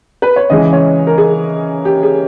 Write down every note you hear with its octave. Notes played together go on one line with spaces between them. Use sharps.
B4
C#5
C#3 E3 G#3 D#5
C#5
A#4
G#4
G4
G#4